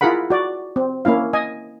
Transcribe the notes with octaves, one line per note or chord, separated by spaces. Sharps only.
E4 F4 G#4 A#4 F#5 B5
F#4 D5
C4
A#3 C#4 E4 F5
D#5 G#5